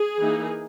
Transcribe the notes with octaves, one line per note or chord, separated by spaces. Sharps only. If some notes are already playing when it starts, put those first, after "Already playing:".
Already playing: G#4
E3 A#3 D#4